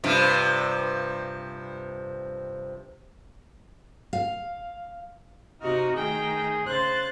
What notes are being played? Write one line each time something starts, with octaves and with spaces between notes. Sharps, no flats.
G2 C3 F3
F5
C3 D#4 F#4 F6
D#3 A3 G#4 G5 A#5
C#3 C5 F#6 A6